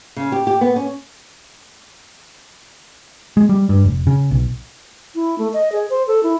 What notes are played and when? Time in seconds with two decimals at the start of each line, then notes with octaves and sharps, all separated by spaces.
0.17 C#3
0.32 G4
0.47 G4
0.61 B3
0.76 C#4
3.37 G#3
3.49 G3
3.69 G2
3.84 F1
4.07 C#3
4.31 B1
5.15 E4
5.38 A3
5.54 D#5
5.72 G#4
5.90 C5
6.07 A4
6.23 E4